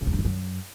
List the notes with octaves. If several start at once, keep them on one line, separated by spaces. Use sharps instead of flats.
C#3
E2
G2
G#2
F#2